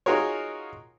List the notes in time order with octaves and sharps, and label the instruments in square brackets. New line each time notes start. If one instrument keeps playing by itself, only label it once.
[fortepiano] D#4 F4 F#4 G#4 A#4 C#5